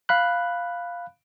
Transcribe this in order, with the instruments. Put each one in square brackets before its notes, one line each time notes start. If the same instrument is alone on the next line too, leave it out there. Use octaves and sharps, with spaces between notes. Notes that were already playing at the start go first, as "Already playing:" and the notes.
[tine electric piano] F5 B5 F#6